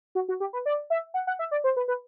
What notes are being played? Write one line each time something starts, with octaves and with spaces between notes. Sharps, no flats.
F#4
F#4
G4
B4
D5
E5
F#5
F#5
E5
D5
C5
B4
B4